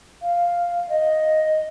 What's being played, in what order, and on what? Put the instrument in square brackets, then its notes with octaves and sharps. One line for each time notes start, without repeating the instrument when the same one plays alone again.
[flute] F5
D#5